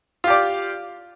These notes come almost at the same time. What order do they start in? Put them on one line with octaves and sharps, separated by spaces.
F4 G4 D5